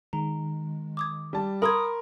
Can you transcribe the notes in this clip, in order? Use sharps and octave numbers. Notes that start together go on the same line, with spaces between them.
D#3 G#3 A#5
D6 D#6 G#6
G3 A5
A#4 B5 C6 D#6 G#6